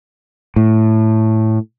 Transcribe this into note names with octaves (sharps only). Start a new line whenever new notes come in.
A2